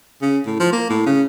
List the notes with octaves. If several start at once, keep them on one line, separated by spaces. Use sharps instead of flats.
C#3
A2
F3
A#3
A2
C#3